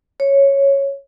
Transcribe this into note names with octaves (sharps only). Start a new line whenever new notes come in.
C#5